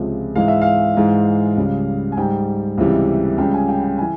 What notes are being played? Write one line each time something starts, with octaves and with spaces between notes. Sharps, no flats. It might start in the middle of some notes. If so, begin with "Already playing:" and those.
Already playing: C#2 C3 F3 G#3
G#2 E3 G#3 F5
E5
F5
G#2 E3 G#3
C#2 C#3 G3
G#5
G#2 G3 G5
C#2 C3 E3 G3
C#2 C#3 G3 G5
G#5
G5
G5
E3 G#5